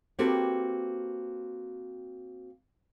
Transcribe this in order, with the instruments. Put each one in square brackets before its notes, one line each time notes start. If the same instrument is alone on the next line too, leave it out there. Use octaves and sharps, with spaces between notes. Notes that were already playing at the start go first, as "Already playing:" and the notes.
[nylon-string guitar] A#3 C4 F#4 G4 A4 B4